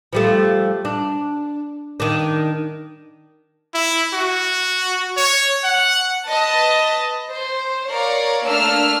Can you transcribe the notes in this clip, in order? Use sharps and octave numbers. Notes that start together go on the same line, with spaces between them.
F3 G3 A3
D4
D#3 D4
E4
F#4
C#5
F#5
B4 D#5 A5
C5
A#4 C#5 D5 F5
A3 A#3 D4 E6 F6